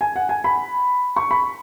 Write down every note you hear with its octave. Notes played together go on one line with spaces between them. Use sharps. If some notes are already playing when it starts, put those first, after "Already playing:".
G#5
F#5
G#5
B5
C#6
B5